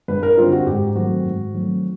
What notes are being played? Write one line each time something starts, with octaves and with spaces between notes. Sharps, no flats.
G2 B4
A#4
D3 G3 C4 D#4 F4
F#4
G#2 G4
D#3 F#3 A3 C4 F#4
G#2
D#3 F#3 A3 C4